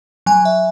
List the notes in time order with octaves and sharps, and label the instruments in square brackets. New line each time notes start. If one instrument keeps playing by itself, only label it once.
[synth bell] F#3 G#5
E5